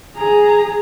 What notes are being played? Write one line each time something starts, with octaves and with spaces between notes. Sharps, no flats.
G#4 A#5